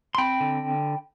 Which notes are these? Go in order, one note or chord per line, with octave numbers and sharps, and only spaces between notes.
C6
C4 G5 B5
D3